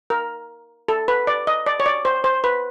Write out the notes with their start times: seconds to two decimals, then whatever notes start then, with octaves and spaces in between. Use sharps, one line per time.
0.10 A#4
0.88 A4
1.08 B4
1.27 D5
1.47 D#5
1.66 D5
1.80 C#5
1.86 D5
2.05 C5
2.24 C5
2.44 B4